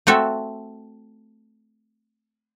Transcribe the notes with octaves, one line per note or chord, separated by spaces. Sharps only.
A3 C4 F#4 A4 E5